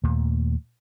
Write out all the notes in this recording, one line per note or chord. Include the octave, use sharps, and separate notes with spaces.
D#2 A#2 A3